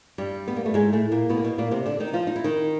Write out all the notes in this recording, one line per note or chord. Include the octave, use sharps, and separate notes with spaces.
G2 G3
B3
A#3
A3
G#2 G#3
A2 A3
A#2 A#3
B2 B3
A#3
B2 B3
A#2 A#3
C3 C4
D3 D4
D#3 D#4
F3 F4
D#4
E4
D#3 D#4